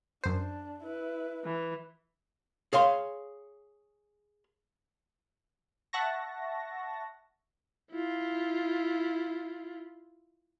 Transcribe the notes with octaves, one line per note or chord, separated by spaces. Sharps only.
F#2 D4 C5
E4 B4
E3
G#4 C#5 F5 C6
E5 F#5 A5 C#6 A#6
E4 F4